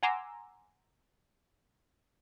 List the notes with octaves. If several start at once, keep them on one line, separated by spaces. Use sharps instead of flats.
F#5 G#5 A#5 C6 D6 E6